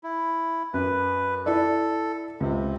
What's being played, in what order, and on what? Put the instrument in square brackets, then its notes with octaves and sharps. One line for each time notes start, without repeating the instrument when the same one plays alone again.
[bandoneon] E4
[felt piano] F#2 [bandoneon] B4
[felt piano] E4 D5 [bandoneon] A4
[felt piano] C#2 [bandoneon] C3